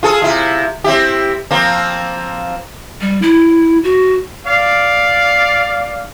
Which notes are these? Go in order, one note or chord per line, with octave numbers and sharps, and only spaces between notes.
F4 G#4 A4
C3 E4 F4
C4 E4 G4
F3 A#3 C4
G3
E4
F#4
D5 F5